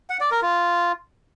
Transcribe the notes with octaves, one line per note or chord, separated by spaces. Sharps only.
F#5
D5
A#4
F4